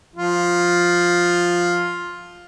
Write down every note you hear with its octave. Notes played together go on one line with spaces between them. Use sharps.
F3 F4